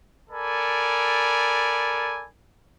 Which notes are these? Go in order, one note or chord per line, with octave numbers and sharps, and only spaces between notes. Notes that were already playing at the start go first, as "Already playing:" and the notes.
A4 A#4 D5 G#5 B5